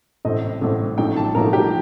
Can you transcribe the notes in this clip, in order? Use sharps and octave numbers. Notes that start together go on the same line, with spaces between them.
A1 A2 A3 C4 D#5
A1 A2 A3 C4
A1 A2 F3 A3 D#4 G5
A5
A1 A2 F3 A3 D#4 A#4
G4